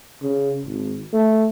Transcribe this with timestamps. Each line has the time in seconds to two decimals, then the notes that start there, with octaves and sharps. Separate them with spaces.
0.22 C#3
0.65 G#1
1.13 A3